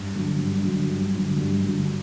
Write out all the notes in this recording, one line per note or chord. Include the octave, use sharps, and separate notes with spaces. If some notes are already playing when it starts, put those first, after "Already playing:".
Already playing: G2
D3 F#3
G2
D3 F#3
G2
D3 F#3
G2
D3 F#3